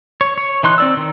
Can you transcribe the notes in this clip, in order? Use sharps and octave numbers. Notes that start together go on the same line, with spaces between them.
C#5
C#5
E3 D#4 C6 F#6
C4 D5 E6
D#3